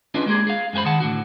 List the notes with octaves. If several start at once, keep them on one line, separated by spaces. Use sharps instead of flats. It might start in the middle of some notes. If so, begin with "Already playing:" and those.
C#4 D4 F4 G#4 B4 D#5
G#3 A#3 G4 G#4
G#4 F5
F#2 G#3 G#4 C5 B5
D#3 G#4 F#5 A5
A2 D3 F#4